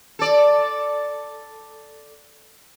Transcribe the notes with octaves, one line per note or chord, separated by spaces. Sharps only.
A4 D5